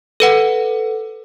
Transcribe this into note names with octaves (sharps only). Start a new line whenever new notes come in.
A4 B4 F#5